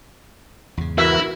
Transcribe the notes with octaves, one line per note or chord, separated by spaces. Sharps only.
E2 G#2 C#3
E3 E4 F#4 A#4 E5